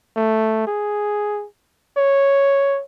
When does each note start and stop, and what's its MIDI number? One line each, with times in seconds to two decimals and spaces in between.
0.16 0.63 57
0.67 1.46 68
1.97 2.82 73